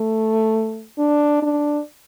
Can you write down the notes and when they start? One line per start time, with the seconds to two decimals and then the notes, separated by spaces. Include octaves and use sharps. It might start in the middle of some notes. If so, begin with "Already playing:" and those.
Already playing: A3
0.99 D4
1.42 D4